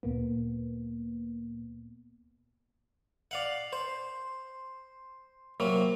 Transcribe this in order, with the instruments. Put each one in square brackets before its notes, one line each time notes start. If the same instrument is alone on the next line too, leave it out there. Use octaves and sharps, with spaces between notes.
[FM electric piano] D2 A#2 A#3 B3
[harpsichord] D5 F5 F#5
C5
C3 F#3 A#3